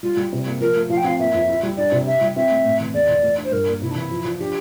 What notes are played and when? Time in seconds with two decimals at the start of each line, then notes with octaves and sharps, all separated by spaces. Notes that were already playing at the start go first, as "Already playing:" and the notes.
0.03 G3 F4
0.17 G3
0.33 C3
0.47 A#3
0.61 F3 A#4
0.76 A3
0.90 F3 F5
0.97 G5
1.04 C4 F5
1.19 A#3 E5
1.34 F2
1.49 E4
1.63 G3
1.77 D4 D5
1.92 C3
2.06 G4 E5
2.21 G3
2.36 C4 E5
2.50 A3
2.65 A2
2.80 E3
2.94 E2 D5
3.08 E3
3.23 A3
3.38 D4
3.44 C5
3.52 G2 A#4
3.67 A#3
3.82 C3 E4
3.91 D4
3.96 E3 E4
4.11 F3
4.25 F3
4.40 D4 G4